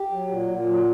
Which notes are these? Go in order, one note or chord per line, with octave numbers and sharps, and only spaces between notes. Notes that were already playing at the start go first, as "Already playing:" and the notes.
Already playing: G4
F#3
A#2
A#2
F#3